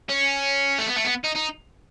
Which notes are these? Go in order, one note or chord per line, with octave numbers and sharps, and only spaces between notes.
C#4
A3
B3
A3
B3
D#4
D#4